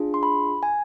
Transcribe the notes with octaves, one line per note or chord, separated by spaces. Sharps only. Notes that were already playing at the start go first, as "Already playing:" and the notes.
Already playing: D4 F4 G#4
C6
B5
G#5